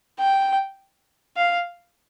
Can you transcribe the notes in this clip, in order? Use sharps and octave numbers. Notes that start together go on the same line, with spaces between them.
G5
F5